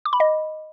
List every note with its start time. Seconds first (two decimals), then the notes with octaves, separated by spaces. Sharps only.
0.05 D6
0.13 B5
0.20 D#5